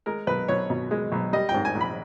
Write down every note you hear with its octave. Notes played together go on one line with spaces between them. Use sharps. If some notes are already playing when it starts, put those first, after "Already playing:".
G#3 A#4
B1 B4
B1 C#5
B2
G#3
B1
G3 D#5
G5
G#2
G#5
A#1
B5